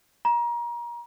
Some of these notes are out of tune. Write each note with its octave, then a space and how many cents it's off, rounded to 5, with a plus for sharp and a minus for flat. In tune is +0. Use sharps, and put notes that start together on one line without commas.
A#5 +30